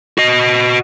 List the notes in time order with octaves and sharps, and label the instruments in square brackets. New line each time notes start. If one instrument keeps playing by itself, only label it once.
[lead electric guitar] F#4 D#5